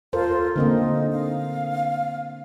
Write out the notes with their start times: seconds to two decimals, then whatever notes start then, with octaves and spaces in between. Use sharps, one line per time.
0.13 F4 A4 A#4 C5
0.56 D3 A#3 C4 D#4
1.12 F5